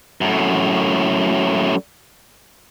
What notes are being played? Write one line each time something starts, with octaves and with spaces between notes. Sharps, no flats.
F#2 A2